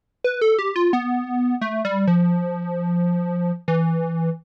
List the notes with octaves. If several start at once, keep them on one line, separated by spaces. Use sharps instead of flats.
B4
A4
G4
F4
B3
A3
G3
F3
E3